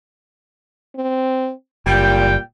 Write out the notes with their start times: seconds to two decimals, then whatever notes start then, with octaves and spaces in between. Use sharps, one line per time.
0.96 C4
1.87 F#1 A#2 G3 G5